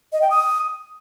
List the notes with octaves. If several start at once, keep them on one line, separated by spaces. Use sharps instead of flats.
D#5
G5
D#6